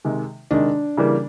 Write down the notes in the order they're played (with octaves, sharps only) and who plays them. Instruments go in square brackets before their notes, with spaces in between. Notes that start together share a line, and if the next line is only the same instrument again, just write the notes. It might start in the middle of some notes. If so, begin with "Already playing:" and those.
[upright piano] C3 D#3 G#3
[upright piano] C3 D#3 G#3 [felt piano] D4
[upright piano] C#3 E3 G3 A#3